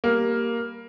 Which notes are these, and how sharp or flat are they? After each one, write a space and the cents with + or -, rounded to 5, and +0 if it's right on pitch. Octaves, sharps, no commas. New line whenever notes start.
G3 +0 A#3 +0